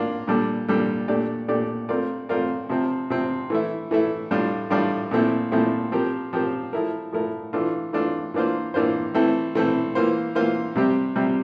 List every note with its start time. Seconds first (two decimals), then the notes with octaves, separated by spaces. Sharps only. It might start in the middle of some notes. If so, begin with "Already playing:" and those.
Already playing: A#3 D4 F4
0.27 A#2 G3 D4 A4
0.68 A#2 G3 D4 A4
1.08 A#2 A3 D4 G4 D5
1.48 A#2 A3 D4 G4 D5
1.89 A3 C4 F4 A#4 D5
2.29 A3 C4 F4 A#4 D5
2.69 C3 F3 C4
3.10 C3 F3 C4
3.50 E3 A3 E4
3.91 E3 A3 E4
4.31 A2 G3 D4 F4
4.70 A2 G3 D4 F4
5.11 A#2 F3 A3 C4 E4
5.52 A#2 F3 A3 C4 E4
5.92 F3 C4 G4 A#4
6.33 F3 C4 G4 A#4
6.73 F3 A3 E4 A#4
7.12 F3 A3 E4 A#4
7.53 E3 A3 D4 F4
7.93 E3 A3 D4 F4
8.34 E3 A#3 D4 F4 C5
8.74 E3 A#3 D4 F4 C5
9.14 E3 A3 C4 E4 A4
9.55 E3 A3 C4 E4 A4
9.95 E3 A#3 F4 C5
10.35 E3 A#3 F4 C5
10.76 C3 G3 C4 G4
11.16 C3 G3 C4 G4